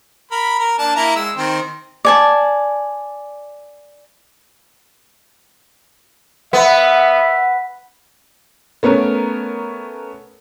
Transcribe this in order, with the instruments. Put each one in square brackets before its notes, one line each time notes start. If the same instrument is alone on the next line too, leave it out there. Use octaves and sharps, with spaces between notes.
[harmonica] A#4 B5
A#4
A#3 D4 A5
A#3 E4 A#5
G#3 E6
D#3 C4 C5
[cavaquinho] D5 G#5 A5
[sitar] B3 [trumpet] E5
[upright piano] A3 B3 C#4 A#4